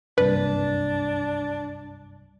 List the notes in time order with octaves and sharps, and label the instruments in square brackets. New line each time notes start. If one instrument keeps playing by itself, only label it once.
[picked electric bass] F#1 C2 G2 [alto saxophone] D4 [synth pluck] B4